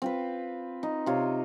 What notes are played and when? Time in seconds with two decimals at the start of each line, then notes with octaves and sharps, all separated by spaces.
0.02 C4 F4 B4
0.83 D#4
1.06 C3 F4 C#5